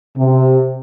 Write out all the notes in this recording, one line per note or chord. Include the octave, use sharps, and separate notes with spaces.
C3